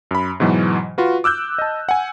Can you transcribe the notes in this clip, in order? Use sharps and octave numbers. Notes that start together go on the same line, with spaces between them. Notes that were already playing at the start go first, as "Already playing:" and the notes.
F#2 B5
G#2 B2 E3 F#3
F4 F#4 B4
D6 E6 F#6 G6
D#5 A5
F#5 G#5